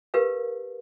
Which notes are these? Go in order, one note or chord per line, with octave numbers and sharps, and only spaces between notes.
G4 A#4 B4 F5